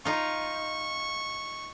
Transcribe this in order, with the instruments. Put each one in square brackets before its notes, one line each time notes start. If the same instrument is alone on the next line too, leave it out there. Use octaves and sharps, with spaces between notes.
[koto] D#4 F4 [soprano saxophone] C#6